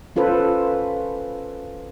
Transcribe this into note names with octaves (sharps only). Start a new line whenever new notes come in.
C#4 F4 A4 B4 C5